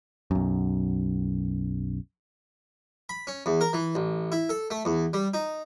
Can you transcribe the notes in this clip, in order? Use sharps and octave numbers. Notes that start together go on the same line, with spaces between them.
B1 F#2
B5
C#4
E2
A#4
E3
A1
E4
A4
A3
E2
G3
D#4